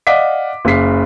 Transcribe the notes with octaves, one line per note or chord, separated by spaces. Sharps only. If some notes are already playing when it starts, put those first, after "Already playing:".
D5 D#5 F5 F#5 D6 B6
F#1 C#3 B6 C7